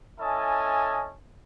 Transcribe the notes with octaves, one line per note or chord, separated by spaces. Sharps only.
C#4 E4 A4 D#5 G#5 A5